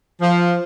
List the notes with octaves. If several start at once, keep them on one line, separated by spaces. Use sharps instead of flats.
F3